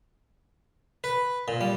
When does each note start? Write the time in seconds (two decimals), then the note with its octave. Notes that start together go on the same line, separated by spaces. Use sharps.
1.04 B4
1.48 A#2
1.61 G3